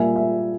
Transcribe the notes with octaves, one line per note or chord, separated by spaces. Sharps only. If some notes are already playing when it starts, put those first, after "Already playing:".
Already playing: A#2 G3 A#3 E5 G#5
E5